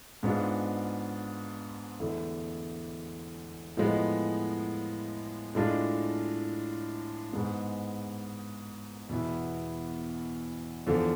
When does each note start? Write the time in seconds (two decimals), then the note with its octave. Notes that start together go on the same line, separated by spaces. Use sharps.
0.23 G#2 G#3 B3 D4 F4
2.00 E2 D3 A3 E4
3.77 A2 F3 G#3 B3
5.55 A2 G#3 D4 F4
7.33 G#2 G#3 B3
9.09 E2 B2 B3 E4
10.87 E2 D3 F3